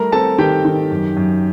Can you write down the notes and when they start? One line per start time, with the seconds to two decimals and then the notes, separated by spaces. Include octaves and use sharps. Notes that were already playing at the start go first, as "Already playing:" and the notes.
Already playing: G3 A3 A#4 A#5
0.12 C4 A4 A5
0.38 D#3 G4 G5
0.65 D#3
0.91 F#2
1.17 F#2